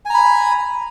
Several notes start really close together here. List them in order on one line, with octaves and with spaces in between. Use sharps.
G#5 A#5 B5